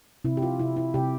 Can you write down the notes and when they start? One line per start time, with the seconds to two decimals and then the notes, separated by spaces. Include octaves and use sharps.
0.24 C3 E4
0.37 G4
0.42 F4
0.59 C3 E4
0.77 E4
0.94 C3 G4